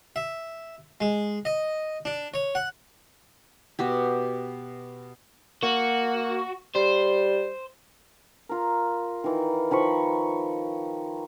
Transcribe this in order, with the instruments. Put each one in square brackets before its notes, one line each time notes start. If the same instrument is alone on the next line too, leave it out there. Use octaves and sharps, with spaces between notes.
[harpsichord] E5
G#3
D#5
D4
C#5
F#5
[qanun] B2 F#4 G4
[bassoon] A#3 [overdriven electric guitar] F#4
[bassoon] G3 [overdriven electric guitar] C5
[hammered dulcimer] F4 A#4
D#3 E3
D#3 F3 B5 C#6